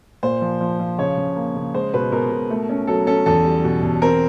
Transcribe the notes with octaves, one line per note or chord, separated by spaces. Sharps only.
A#2 C5
F3
F3
F3
C#3 C#5
C#3
A#3
C#3
G#3 C5
B2 B4
B2 A#4
B2
A3
C#4
F#3 A4
C#4 A4
E2 A4
G3
B2
E2
C4 A#4